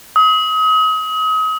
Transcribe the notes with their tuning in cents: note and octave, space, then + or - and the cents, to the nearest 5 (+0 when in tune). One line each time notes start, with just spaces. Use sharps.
D#6 +35